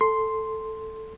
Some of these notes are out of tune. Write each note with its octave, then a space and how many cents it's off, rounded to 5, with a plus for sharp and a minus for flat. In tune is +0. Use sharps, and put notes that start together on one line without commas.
A4 +0 C6 +0